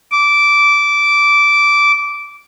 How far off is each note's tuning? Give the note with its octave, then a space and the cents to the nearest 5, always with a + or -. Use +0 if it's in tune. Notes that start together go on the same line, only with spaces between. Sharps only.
D6 -15